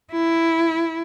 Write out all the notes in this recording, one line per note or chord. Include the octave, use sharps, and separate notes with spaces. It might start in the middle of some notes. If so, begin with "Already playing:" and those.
E4